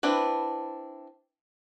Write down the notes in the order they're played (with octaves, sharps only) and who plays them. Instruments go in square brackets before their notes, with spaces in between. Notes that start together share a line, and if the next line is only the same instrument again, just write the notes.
[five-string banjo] C4 D4 E4 B4